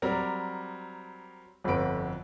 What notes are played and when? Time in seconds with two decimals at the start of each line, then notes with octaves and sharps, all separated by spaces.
0.02 F#3 G3 C4 A#4 D5
1.64 G1 F2 D3 F#4 B4 D7